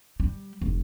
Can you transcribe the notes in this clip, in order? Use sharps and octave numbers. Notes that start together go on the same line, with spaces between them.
G3
F1